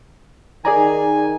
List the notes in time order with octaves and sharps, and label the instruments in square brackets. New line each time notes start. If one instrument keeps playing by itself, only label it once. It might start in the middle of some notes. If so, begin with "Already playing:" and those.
[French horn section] D#3 [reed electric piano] G#4 D5 A#5 [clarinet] G#5